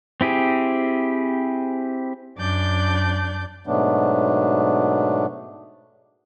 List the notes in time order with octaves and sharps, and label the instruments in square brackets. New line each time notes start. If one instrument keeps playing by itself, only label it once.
[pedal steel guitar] C4 E4 G4 G#4
[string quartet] F#2 D4 D5 G6
[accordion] G#2 B2 F#3 A3 B3 D4